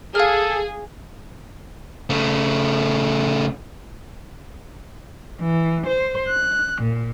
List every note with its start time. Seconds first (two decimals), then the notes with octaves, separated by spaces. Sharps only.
0.15 G#4 A4 F5 F6
2.10 C#3 A3
5.40 E3
5.87 C5
6.30 F#6
6.82 A#2